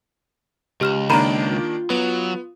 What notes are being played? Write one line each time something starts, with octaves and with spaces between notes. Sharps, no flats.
C#2 G4 F6 E7
D#3 A#3 D4 A#5 B5
F4
F#3 B3